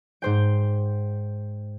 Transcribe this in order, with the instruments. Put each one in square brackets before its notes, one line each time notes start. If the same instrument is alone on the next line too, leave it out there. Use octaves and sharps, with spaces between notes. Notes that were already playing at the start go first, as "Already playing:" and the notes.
[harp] G#2 C5 G5